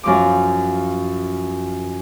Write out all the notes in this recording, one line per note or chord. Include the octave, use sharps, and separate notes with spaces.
F#2 F3 D6